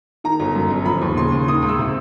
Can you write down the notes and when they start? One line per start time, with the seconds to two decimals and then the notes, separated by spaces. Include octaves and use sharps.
0.24 D#3 A#5
0.40 G1
0.55 F#2
0.71 G1
0.85 F3 B5
1.01 D#2
1.17 C#3 C6
1.32 D#2
1.47 D#3 D#6
1.63 C#2
1.69 E6
1.79 C3